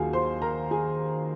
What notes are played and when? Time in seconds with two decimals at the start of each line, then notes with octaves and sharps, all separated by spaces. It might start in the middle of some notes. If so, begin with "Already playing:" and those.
Already playing: D#2 D#3 F#3 F4 F#4 G#4 F5 G#5
0.13 C5 C6
0.42 A#4 A#5
0.71 G#4 G#5